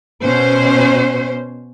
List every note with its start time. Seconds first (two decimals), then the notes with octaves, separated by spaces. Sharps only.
0.24 B2 C#4 C5